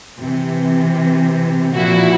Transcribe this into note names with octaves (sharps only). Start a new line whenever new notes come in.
C3 E3
A#2 F3 E4 F#4